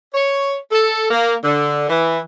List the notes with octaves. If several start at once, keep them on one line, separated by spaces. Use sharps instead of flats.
C#5
A4
A#3
D3
E3